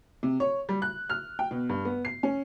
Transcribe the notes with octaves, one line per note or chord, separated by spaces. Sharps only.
C3
C#5
G3
F#6
F6
G5
B2
G2
B3
C7
C#4